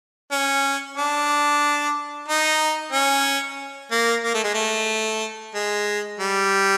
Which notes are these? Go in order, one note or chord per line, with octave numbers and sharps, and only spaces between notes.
C#4
D4
D#4
C#4
A#3
A#3
A3
G#3
A3
G#3
G3